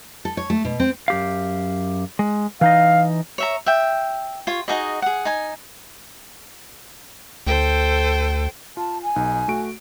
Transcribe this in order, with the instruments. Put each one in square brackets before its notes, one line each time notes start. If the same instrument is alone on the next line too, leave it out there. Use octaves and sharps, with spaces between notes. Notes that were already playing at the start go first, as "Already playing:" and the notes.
[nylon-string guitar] A4
C#5
A3
B2
C4
[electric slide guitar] F#2 G4 F5
G#3
[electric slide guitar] E3 D#4 D#5 [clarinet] F5
[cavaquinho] C#5 E5 A#5
E5 G5
F4 C#5
D#4 F#4 G#4 D#5
G#4 F#5
D#4 G#5
[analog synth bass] D2 [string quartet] A4 C5 G5
[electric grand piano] F4 [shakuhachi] A5
[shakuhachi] G#5
[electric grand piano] B1 D#4
A3 F#4 D7